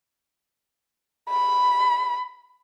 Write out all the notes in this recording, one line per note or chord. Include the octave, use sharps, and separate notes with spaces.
B5